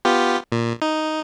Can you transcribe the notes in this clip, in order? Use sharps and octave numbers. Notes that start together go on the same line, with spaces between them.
B3 F4 G4
A#2
D#4